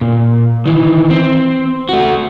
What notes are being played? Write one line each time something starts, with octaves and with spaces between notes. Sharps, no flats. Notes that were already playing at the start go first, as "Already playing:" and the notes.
A#2
D#3 E3
C4
A3 F#4